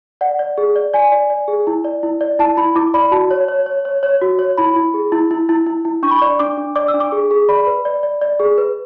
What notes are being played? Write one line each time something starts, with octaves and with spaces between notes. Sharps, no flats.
D5 F#5
D5
G#4
D5
D5 G#5
D5
D5
G#4
E4
D5
E4
D5
E4 A5
E4 B5
E4 D6
D5 B5
F#4 A5
C#5
C#5
C#5
C#5
C#5
F#4
C#5
E4 B5
E4
G#4
E4
E4
E4
E4
E4
D4 C#6
B5
D5 C#6
D4 D6
D4
D5 D6
E6
D4
D6
G#4
G#4
D5 B5
B4
D5
D5
D5
G#4
B4